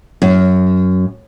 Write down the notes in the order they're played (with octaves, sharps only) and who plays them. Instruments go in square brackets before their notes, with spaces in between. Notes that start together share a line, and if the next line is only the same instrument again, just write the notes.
[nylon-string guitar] F#2